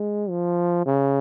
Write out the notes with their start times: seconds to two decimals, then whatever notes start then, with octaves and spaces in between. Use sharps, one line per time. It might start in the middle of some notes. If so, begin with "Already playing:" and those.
Already playing: G#3
0.30 F3
0.86 C#3